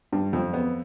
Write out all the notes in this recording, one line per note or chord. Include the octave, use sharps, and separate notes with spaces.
G2
F2
B3